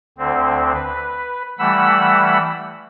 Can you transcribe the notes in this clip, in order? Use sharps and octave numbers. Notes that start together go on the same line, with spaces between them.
D2 D3 C4
B4
E3 G3 A3 F#5 B5 E6